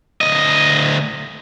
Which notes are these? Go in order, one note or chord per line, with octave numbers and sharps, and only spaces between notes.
D2 D#5